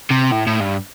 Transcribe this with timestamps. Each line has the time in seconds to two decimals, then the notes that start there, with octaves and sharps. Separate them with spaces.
0.11 C3
0.32 A2
0.47 A2
0.61 G2